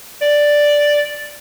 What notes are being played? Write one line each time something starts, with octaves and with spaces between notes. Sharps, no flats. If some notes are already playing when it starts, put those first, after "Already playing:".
D5